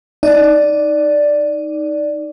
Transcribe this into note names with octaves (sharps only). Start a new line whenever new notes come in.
D#4 D5